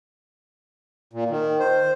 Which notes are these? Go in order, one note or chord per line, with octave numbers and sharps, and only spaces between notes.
A#2
D#3
C5